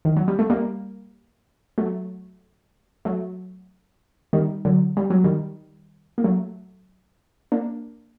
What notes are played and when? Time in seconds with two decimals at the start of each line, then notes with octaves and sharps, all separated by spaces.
0.05 D#3
0.16 F#3
0.28 G3
0.39 A3
0.50 G3 A#3
1.78 F#3 A3
3.05 F#3 A3
4.33 D#3 G3
4.65 D3 F#3
4.97 G3
5.10 F#3
5.24 D#3 G3
6.18 A#3
6.24 F#3 A3
7.52 A#3 D4